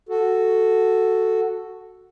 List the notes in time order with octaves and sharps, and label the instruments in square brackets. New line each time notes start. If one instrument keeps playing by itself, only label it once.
[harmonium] F#4 A4